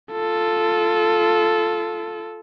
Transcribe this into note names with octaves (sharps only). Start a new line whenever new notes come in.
F4 A4